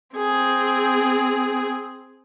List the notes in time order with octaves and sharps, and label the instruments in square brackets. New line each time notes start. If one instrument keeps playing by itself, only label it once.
[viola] C4 G#4